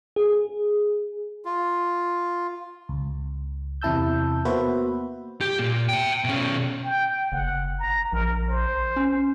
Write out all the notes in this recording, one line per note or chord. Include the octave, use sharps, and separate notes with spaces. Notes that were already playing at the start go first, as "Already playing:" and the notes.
G#4
F4
C#2
E2 C3 E4 A5 E6 G6
A#3 B3 F#4 B4 C5 E5
G4
A#2
E5 G5
B2 C#4
G5
F#1 F#5
A#5
A#1 A#4
C5
C#4